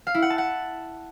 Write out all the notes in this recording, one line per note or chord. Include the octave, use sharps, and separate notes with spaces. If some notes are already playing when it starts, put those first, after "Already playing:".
F5
E4
F#5
A5
F#5